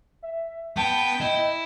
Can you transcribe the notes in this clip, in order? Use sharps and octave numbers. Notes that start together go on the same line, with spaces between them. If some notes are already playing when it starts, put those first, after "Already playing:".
E5
B3 G5 A5
E4 D#5